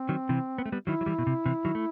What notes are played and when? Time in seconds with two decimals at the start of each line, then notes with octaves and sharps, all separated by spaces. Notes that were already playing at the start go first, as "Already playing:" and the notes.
Already playing: C4
0.09 D#3 F#3
0.29 C3 E3
0.58 B3
0.66 A3
0.72 G3 B3
0.87 D#3 F#3 E4
1.01 F#3
1.06 E3 G3
1.18 B2
1.27 C3
1.46 C3 E3
1.65 D#3 F#3
1.75 A3